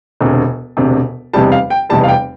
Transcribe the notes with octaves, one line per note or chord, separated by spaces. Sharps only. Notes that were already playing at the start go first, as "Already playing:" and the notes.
E1 D2 C3
E1 D2 C3
F1 E2 C3 G3 A5
F5
G5
F1 E2 C3 G3 A5
F5
G5